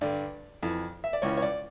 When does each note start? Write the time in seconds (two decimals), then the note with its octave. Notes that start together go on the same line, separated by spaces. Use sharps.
0.01 G2 D3 D5
0.63 F2 E3
1.04 E5
1.13 D5
1.22 C#2 C#3 E3 C#5
1.37 C#5
1.42 D5